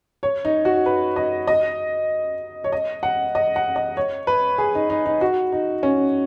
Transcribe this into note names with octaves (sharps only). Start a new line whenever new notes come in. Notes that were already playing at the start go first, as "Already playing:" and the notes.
C#5
D#4
F#4
B4
D#5
D#5
C#5
D#5
F#5
D#5
F#5
D#5
C#5
B4
G#4
D#4
D#4
D#4
F#4
D#4
C#4